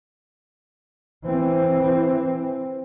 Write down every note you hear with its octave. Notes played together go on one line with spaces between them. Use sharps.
E3 C4